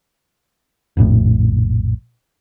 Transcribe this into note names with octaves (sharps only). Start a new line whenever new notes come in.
F1 A#1 A2